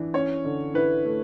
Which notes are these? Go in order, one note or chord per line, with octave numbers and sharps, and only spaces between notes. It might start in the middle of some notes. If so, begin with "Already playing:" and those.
Already playing: E3 D4
C#4 C#5
D3
E4 B4
A3